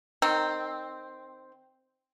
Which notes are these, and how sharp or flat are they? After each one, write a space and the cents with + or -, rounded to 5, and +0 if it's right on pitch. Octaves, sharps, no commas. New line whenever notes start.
D#3 -10 C4 +0